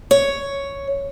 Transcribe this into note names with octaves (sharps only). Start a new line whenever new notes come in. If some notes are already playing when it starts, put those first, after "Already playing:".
C#5